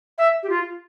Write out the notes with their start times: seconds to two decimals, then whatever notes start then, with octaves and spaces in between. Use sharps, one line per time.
0.18 E5
0.43 G4
0.50 F4